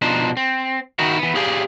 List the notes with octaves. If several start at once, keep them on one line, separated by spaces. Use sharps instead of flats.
B2 F3 D4 D#4 C5
C4
D#3 D#4 E4 F#4
E3 B3
G4 G#4 C5 D5 F5 G#5